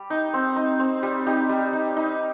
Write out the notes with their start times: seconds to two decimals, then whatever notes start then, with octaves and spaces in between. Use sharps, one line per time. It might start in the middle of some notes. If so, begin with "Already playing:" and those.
Already playing: G3 G4
0.10 D#4
0.34 C4
0.56 D#4
0.80 C4
1.03 G3
1.26 D#4 G4
1.49 G3
1.73 D#4
1.96 D#4